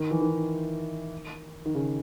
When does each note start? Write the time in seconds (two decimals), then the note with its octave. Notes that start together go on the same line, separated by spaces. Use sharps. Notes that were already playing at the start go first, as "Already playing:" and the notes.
Already playing: D#3
0.11 E3
0.21 D#3
1.66 D#3
1.75 C#3